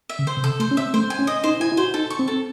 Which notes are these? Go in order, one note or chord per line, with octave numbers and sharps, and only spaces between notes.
E5
C#3
C5
C3
C#3 A4
A3 C5
C#4
C4 E5
A3 C5
G#5
C#4
D#5
D#4 C5
E4 G#5
E4
F#4 C5
D#4 A4
C#6
C4
A4